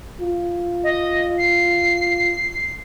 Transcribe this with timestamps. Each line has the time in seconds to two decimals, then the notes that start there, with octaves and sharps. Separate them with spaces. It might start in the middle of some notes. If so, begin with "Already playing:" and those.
0.21 F4
0.83 D#5
1.38 C7